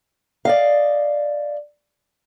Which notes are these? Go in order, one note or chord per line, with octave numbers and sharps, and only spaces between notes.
D5 D#5 F5